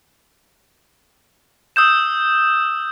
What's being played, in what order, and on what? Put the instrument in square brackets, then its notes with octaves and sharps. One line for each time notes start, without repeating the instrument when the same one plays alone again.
[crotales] D#6 E6 G6 E7